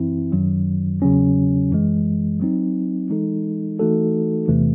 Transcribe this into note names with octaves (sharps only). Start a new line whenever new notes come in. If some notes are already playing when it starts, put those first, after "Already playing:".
Already playing: F#2 E3 C4 E4
F#2 D#3 F#3
E2 C#3 F#3 C#4
F#2 E3 G#3
F#3 C4 D#4
E3 G#3 D#4 A4
E3 A3 D#4 F#4 A4
E2 C3 E3 A3